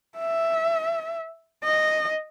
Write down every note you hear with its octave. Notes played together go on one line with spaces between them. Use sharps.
E5
D#5